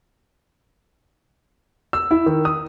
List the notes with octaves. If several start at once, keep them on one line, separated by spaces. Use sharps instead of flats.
E6
E4
D#3
D#6